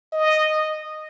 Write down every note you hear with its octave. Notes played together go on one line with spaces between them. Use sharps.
D#5